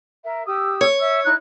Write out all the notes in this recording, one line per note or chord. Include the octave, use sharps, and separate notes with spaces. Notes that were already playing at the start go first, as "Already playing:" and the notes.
A#4 E5
G4 D#6 E6
C#5
E5 E6
D#4 E4 F#6